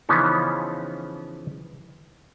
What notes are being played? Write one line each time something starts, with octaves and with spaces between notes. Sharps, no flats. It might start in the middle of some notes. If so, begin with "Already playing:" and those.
C#3 E3 F3 B3 C#4 D#4